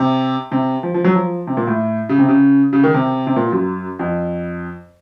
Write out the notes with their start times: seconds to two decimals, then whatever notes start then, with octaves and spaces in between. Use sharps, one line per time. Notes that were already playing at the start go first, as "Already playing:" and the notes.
Already playing: C3
0.52 C3
0.83 F3
0.94 F3
1.04 F#3
1.15 F3
1.47 C3
1.57 A#2
1.67 A2
2.09 C#3
2.18 C3
2.28 C#3
2.73 C#3
2.84 D#3
2.94 C3
3.27 C3
3.36 A#2
3.52 F#2
3.99 F2